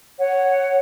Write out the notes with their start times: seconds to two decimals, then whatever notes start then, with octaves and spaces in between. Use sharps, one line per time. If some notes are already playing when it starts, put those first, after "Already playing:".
0.18 C#5 F#5